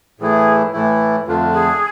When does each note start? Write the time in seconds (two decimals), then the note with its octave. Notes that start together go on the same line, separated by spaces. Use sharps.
0.20 A2 E3 A3 E4 G#4
0.73 A2 E3 A3 E4
1.26 F2 D3 A3 D4 F4
1.53 G#4